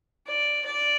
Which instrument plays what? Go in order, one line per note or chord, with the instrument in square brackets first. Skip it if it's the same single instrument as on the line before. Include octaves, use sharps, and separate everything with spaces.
[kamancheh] D5
D5